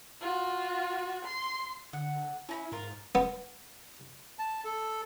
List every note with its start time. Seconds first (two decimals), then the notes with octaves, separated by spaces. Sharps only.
0.21 F4 F#4
1.25 C6
1.93 D3 F#5
2.49 C#4 E4 A#5 B5
2.72 G#2 F4 A#4
3.15 B3
4.39 A5
4.65 A4